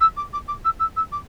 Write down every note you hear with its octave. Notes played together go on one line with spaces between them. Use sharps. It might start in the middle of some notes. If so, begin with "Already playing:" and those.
E6
D6
D6
D6
E6
E6
E6
D6